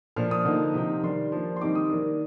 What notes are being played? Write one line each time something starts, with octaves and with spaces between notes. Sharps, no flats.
A#2 F3 A#3 D4 F6
D#6
D3 F3 A#3 D#4
C3 F3 C4 D#4
D#3 G3 D4 C6
F3 A#3 D4
C6
D#3 G3 C4 D#4 D6
D#6
D#3 A#3 D4